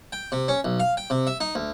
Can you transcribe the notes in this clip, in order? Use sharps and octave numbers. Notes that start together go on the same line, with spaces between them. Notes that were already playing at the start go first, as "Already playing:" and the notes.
G5
C3
C#4
B1
F5
G5
C3
E5
D#4
D2